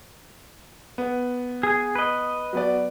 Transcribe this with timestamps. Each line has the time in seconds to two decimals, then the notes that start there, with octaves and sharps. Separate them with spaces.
0.98 B3
1.63 G#4
1.95 B4 D#5
2.53 F#3 B3 D5